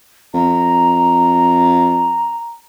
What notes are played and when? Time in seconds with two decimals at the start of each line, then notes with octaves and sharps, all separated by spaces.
0.34 F2 A#5